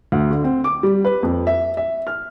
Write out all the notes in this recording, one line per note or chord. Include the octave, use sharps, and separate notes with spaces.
D2
D3
C4
D6
G3
B4
F2
E5
E5
F6